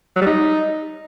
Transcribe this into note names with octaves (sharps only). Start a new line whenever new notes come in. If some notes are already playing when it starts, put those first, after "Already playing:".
F#3
G3
D#4